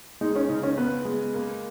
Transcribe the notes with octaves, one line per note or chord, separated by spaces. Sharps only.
G#3 D#4
C#4
C#3 D#4
C#4
B3 B4
G#3
A#3